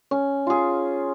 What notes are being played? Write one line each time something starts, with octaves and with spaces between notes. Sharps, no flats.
C#4
F4 G#4